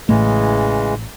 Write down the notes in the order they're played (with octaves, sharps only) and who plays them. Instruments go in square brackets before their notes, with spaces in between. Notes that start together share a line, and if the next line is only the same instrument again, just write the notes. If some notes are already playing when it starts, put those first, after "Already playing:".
[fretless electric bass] A1 A2 A3 [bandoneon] C#3 E3 G#3